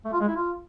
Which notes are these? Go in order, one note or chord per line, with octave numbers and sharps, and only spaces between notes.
A3
F4
G#3
E4
F4